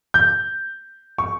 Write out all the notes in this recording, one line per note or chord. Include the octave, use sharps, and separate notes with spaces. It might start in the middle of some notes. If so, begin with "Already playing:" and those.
G6
C#6